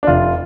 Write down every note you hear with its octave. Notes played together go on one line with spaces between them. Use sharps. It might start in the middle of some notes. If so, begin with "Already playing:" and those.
D4
F1 F4